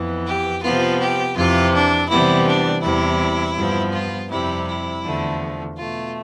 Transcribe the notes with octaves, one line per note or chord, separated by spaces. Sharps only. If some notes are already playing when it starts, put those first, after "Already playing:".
Already playing: F2 E3 B3
G4
C3 F3 B3 F4
G4
F2 C3 E3 F4
D4
C3 E3 G3 B3 E4
D4
E2 C3 G3 E4
G2 F3 B3
F4
F2 C3 G3 E4
E4
E2 D3 F3 A3
B2 A3 F4